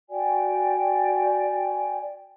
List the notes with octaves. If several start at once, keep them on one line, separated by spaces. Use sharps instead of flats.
F#4 D5 G5 G#5